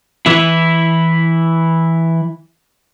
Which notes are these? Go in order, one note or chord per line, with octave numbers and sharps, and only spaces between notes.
E3 E4